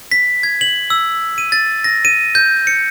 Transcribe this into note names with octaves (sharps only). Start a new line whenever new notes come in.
B6
G#6
F#7
E6
D#7
A6
A#6
D#7
G6
C#7